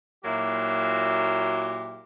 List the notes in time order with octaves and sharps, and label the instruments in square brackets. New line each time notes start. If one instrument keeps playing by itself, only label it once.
[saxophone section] A#2 F#3 A#3 E4 F#4 G4